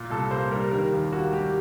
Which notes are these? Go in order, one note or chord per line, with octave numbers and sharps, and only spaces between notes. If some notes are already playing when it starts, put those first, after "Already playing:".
Already playing: A#2
C2 A4
A#3 C5
G3 A#4
D#3 A#4
D#2
A#3 F#4
G3 G4